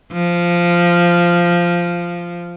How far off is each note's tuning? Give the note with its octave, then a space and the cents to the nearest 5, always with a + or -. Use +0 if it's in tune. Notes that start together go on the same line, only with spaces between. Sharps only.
F3 -10